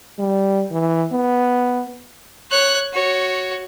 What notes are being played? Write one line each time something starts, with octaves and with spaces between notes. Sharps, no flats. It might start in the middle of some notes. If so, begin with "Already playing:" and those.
G3
E3
B3
C#5 F#6
F#4 C#5